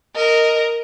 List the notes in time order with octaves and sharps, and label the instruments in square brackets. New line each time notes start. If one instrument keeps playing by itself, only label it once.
[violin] A#4 [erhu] D#5